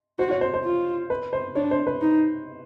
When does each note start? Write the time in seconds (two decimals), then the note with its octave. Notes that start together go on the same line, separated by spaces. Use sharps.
0.19 F#4 C5
0.31 C#5
0.41 C5
0.54 C5
0.65 F4
1.10 B4
1.33 C5
1.55 D4 C#5
1.71 C5
1.87 B4
2.01 D#4